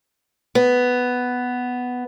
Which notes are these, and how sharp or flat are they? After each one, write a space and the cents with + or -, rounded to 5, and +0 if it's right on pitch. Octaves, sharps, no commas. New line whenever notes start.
B3 +5